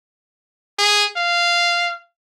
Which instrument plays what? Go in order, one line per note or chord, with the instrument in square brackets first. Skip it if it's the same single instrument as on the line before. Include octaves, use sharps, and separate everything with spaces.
[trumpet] G#4
F5